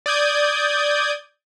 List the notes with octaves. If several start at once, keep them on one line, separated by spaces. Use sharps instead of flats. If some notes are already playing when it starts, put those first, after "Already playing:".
D5 D#6 G6 G#6